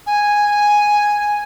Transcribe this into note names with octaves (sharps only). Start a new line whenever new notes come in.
G#5